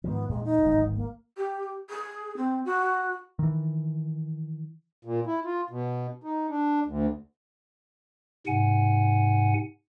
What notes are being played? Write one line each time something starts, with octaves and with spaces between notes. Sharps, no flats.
G#2 D#3 F3 B3
E2 A#2 G#3
D#4
D1 G#1 G#2
A#3
G4
G#4
C4
F#4
D#3 E3
A#2
E4
F4
B2
D#4
D4
D2
G#2 C3 F#5 G#5